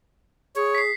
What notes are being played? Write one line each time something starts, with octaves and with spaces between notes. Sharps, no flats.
G#4 C#5
B6 C7